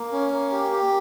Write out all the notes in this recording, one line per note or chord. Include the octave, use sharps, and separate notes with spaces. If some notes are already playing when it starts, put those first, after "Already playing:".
Already playing: A#3
C#4
A#3
G4
G4